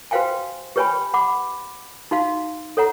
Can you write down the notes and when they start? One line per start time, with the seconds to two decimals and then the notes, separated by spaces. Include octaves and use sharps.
0.11 F#4 B4 C5 F5 G5 G#5
0.76 G4 B4 C#5 G5 G#5 B5
1.14 F#5 B5 D6
2.11 D#4 F#4 F5
2.77 A4 C#5 F#5 A#5